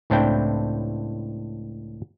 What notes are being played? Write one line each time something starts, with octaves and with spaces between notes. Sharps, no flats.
C#2 A2 C4 D4 E4 G5